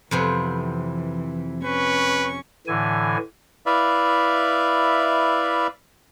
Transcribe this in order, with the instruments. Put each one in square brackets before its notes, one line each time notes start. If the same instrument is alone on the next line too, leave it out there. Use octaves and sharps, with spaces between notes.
[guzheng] F2 C3 B3 [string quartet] E3
[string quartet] C#4 C#6 [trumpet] B4
[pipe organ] A2 D3 E3 G#5
[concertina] E4 B4 D5 E5 F5